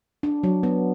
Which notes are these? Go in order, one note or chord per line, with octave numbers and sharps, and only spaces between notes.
D4
F#3
B3